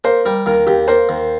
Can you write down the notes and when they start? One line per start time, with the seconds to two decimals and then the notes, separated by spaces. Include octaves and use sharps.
0.04 A#3 C5
0.25 G3 A#4
0.46 D#2 A#4
0.67 D#2 G4
0.88 A#3 C5
1.09 D#2